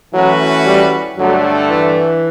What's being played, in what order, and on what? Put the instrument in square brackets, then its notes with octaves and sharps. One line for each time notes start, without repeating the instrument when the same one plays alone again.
[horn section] E3 A3 C#4 F#4 B4 [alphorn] F#3
[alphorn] G3
[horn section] G2 D3 A3 [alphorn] F#3
[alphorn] E3